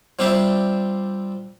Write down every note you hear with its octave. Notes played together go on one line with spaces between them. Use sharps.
F3 G3 C4 D4 C5 E5